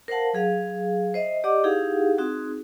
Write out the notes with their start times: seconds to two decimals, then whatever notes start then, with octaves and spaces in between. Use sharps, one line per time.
0.08 A#4 C5 F5 F#5 A5
0.33 F#3 G#4 F5
1.14 C5 D#5 E5
1.44 G4 D5 D#5 F#5 D6
1.64 D#4 E4 G4 G#4 F5 F#5
2.18 C4 D#4 F#4 G#4